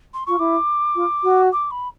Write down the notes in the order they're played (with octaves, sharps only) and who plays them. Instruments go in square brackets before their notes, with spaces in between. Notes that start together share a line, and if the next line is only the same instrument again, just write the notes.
[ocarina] C6
[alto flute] F4 [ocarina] C#6
[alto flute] E4 [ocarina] D6
[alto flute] F4
F#4
[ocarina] D6
B5